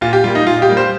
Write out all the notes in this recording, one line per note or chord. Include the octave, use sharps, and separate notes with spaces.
A#2 F4
G4
G3 A#3 F4
D#4
A#2 F4
G4
G3 A#3
C5